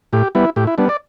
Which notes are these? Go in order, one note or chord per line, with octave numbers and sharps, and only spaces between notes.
A2 G4
G3 B3 E4
A2 G4
E4
G3 B3 D4
D5